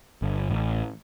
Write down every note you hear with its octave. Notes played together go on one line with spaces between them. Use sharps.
G1
A1